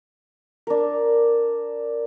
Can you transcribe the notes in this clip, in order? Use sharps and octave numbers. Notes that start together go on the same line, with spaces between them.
D4 A#4